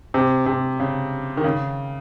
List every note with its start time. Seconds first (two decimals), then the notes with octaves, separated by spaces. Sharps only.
0.14 C3
0.46 C3
0.80 C#3
1.37 D#3
1.44 C#3